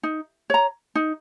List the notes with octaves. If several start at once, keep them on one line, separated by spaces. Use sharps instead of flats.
D#4
C#5 A#5
D#4